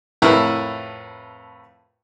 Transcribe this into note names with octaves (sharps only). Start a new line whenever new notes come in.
F2 A2 E4 A#4 B4 B5